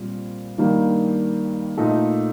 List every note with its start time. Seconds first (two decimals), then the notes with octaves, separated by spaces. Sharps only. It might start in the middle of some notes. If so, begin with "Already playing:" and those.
Already playing: A#2 G3 C4 F4
0.58 G2 D#3 G3 A#3
1.77 A#2 A3 D#4 A4